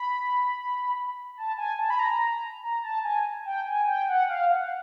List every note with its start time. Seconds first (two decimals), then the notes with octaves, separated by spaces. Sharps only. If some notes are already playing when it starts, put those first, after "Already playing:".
Already playing: B5
1.37 A5
1.58 G#5
1.79 A5
1.90 B5
1.99 A#5
2.63 A#5
2.84 A5
3.04 G#5
3.46 G5
3.67 G#5
3.87 G5
4.09 F#5
4.30 F5
4.50 F#5